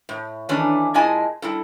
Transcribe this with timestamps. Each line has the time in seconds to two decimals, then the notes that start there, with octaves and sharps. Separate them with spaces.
0.09 A2
0.49 D#3 E3 A3 C#4 D4
0.94 A#2 G#3 E4 D#5 G#5 A5
1.42 G3 E4 A4